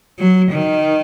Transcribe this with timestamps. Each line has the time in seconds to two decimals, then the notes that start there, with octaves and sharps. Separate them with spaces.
0.19 F#3
0.51 D#3